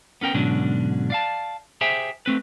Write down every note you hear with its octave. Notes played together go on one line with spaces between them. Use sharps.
B3 C#4 A#4 G5
G#2 B2 D3 F#3 C#4 D4
D5 F5 A5
G4 G#4 C5 E5 G5 G#5
A3 C4 B4